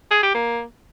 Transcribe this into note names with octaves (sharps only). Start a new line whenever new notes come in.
G#4
G4
A#3